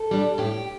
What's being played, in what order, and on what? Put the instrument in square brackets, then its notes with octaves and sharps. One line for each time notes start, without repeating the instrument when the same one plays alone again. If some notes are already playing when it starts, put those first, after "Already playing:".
Already playing: [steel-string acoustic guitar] A4
G3 D4
A2 G4